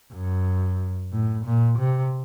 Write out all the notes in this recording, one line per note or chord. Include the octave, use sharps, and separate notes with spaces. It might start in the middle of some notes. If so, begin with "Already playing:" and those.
F#2
A2
A#2
C3